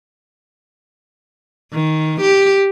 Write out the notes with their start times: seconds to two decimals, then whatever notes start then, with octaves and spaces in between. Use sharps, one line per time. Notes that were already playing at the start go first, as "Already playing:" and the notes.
1.73 D#3
2.21 G4